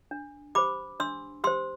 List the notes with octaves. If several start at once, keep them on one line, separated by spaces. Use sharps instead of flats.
D4
G4 C5 B5 D6
D4 C6 E6
G4 C5 C6 E6